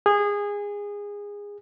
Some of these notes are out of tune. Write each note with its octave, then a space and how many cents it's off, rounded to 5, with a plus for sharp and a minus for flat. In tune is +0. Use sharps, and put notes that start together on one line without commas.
G#4 -20